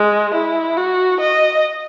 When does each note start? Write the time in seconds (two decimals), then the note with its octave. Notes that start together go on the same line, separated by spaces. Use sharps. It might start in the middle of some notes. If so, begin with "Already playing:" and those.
Already playing: G#3
0.34 E4
0.77 F#4
1.20 D#5